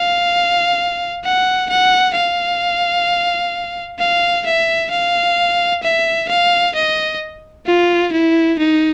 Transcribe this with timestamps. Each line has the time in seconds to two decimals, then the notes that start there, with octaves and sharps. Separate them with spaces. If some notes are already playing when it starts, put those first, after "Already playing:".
Already playing: F5
1.25 F#5
1.69 F#5
2.16 F5
3.99 F5
4.45 E5
4.91 F5
5.83 E5
6.29 F5
6.75 D#5
7.67 F4
8.13 E4
8.59 D#4